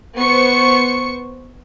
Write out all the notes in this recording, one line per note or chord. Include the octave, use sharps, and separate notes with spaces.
B3 C5 C#6 C#7